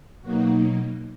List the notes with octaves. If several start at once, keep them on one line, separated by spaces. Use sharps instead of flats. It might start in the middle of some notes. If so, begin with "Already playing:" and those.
B2 F#3 A#3 D#4 F#4